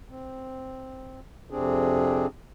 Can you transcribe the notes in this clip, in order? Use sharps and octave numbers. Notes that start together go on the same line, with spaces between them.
C4
F2 C3 C4 D4 G#4